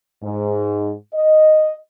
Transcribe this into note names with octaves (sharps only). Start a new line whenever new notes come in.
G#2
D#5